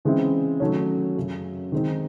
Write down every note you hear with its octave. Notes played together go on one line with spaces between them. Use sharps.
C#3 E3 G#3 C4 E4
D#3 F#3 A3 C#4
F#2 C#3 F#3
D#3 G#3 C4 D#4